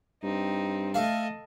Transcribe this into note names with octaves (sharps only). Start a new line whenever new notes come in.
G2 C4 D#4
A3 A4 D#5 F5